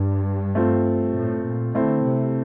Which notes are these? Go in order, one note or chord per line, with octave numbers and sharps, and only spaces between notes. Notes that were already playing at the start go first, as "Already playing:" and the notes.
Already playing: G2 D4
A3 C4 F4
A2
A#2
D3 A3 C4 E4
C3